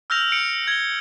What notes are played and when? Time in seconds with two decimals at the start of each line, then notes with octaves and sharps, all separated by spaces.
0.10 E6 F6 G6 A#6 F7
0.32 C#7 D7
0.68 G#6 G7